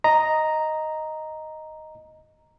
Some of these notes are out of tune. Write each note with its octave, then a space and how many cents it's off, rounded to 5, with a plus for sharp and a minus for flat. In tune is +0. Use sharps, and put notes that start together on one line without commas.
D#5 +0 A#5 +0